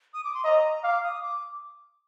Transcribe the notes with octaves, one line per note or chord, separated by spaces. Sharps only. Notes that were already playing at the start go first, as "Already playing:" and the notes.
D#6
D6
C6
D#5 A#5
F5 D6
D#6
D6